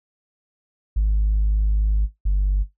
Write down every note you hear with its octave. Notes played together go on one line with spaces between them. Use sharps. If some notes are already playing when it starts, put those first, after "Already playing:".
G#1
G1